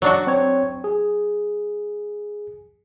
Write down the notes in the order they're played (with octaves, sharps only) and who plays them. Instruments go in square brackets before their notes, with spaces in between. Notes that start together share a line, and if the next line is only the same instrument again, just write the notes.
[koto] F#3 D4 F#4
[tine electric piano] C4 C#5
G#4